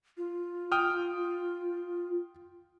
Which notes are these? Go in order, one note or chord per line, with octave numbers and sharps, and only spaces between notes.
F4
G5 D#6 F6